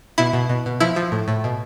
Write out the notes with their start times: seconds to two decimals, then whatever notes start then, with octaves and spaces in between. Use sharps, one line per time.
0.18 B2 E4
0.33 B2
0.49 B2
0.66 B2
0.80 F3 E4
0.96 F3
1.12 A2
1.28 A2
1.44 B2